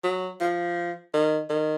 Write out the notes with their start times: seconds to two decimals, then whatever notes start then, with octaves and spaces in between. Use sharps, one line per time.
0.04 F#3
0.40 F3
1.13 D#3
1.49 D#3